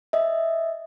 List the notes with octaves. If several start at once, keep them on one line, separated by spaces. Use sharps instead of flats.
D#5 E5